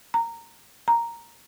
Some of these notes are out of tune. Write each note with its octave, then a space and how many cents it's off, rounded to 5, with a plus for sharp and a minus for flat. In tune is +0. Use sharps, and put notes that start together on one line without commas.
A#5 -15
A#5 +0